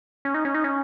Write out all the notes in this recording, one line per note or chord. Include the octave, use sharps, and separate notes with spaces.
C#4
D#4
C#4
D#4
C#4